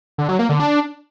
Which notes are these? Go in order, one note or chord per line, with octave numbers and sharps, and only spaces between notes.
D3
F#3
A#3
D3
D4